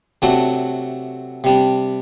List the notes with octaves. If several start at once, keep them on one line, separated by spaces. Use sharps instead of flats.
C3 F#3 A3 D4 F#4
C3 G3 D4